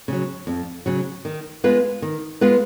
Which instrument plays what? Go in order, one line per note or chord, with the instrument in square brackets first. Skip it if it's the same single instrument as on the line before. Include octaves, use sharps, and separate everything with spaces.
[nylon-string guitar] C#3 F#3
F2
C#3 F#3
D#3
G#3 B3 F4 B4
D#3
G#3 B3 F4 B4